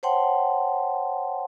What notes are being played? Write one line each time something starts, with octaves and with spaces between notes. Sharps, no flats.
C5 C#5 F#5 G5 A5 C6